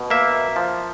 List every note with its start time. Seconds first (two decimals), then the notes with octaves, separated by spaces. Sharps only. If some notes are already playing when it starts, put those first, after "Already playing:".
Already playing: B2
0.10 A#3 E5
0.56 F3